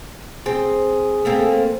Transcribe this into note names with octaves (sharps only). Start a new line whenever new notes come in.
C4 G#4
A3 A#3 C4